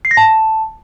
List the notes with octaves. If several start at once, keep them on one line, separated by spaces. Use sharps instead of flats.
C7
A#6
A5